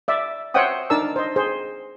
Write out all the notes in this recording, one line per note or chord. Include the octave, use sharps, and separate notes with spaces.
D5 E5
C5 C#5 E5 F#5 G5 D#6
D4 D#4 A#4 D5 A5 E6
C5 D#5
G#4 C5